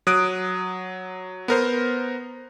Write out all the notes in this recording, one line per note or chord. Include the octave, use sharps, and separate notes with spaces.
F#3 D#6 F#6 D7
B3 A#4 C5